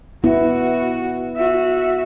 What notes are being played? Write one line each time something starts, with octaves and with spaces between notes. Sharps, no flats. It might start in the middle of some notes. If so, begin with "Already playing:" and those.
B3 E4 F#4
F#4 E5